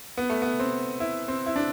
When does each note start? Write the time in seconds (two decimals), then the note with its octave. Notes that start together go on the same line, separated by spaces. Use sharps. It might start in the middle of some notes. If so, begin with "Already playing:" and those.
0.17 B3
0.30 A3
0.42 B3
0.59 C4
1.00 E4
1.28 C4
1.46 E4
1.56 D4